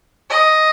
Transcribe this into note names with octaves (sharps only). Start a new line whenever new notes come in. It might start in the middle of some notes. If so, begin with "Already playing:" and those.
D#5